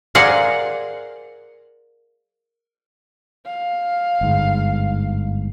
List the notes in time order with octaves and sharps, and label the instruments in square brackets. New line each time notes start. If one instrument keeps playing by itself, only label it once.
[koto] G#4 A#4 C5 D5 F5 F#5
[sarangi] F5
[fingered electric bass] G1 G#2